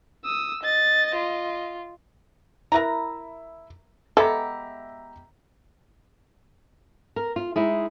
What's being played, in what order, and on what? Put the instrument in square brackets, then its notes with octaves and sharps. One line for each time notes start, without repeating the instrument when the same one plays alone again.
[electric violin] D#6 E6
[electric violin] D#5 [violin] A6
[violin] F4
[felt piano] E4 E5 [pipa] A#4 B4 A#5
[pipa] G#3 B3 G4 [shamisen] A4 [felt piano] E5 A#5
[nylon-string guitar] A#4
F4
G#3 D#4 E4 G#4